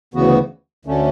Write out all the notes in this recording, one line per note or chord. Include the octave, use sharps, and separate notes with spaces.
D2 C#3 E3 B3 F#4
D2 D3 A3 C#4